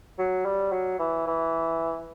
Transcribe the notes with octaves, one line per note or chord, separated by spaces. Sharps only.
F#3
G3
F#3
E3
E3